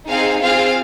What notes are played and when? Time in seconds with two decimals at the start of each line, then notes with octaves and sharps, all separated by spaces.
0.08 C4 D#4 G#4 F5
0.41 C4 F4 G#4 F5